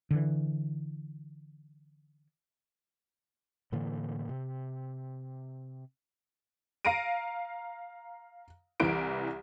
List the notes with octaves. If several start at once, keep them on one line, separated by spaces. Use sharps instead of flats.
D3 E3
A2 D3 E3 A#3
C3
F5 A#5 A#6 D7 D#7
C2 E3 D7